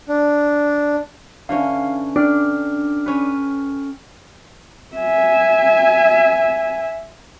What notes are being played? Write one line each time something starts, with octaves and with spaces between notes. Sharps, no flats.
D4
D3 E3 C#4 F5
D4 A4 G5 F6
C#4 B4
E5 G#5